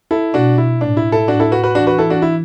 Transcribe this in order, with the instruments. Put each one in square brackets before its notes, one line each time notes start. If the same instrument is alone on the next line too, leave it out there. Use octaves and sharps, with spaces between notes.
[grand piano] E4 A4
[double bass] B2 [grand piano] D4 F#4
[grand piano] E4
[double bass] A2 [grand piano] D4
[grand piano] E4
E4 A4
[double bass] A2 [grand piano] D4 F#4
[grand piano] E4 A4
F#4 B4
F#4 B4
[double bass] E3 [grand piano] D4 F#4
[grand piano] F#4 B4
E4 A4
D4 F#4
E4